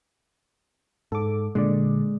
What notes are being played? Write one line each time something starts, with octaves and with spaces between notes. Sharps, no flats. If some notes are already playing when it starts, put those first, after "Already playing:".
G#2 A4 D6
A#2 D3 G#3 D5